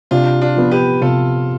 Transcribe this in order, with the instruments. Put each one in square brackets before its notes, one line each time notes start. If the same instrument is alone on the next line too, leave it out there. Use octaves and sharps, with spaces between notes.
[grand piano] C3 [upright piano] D4 F4
[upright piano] D4 F4
[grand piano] F3 B3
[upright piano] G4 B4
[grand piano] C3 [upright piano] F4 A4